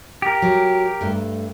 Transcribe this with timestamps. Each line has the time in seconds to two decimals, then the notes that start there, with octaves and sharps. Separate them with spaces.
0.22 G4 A#4
0.42 F#3
1.01 G2 A3